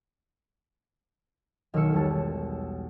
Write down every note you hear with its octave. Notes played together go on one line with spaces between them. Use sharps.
B1 D#3 A#3 A#4 E6 C#7
E2 G3 G#3 C#5 A5 C#7